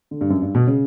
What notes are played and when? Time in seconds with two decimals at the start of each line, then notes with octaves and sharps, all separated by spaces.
0.11 D3
0.21 G2
0.30 F#2
0.42 G2
0.55 B2
0.67 C#3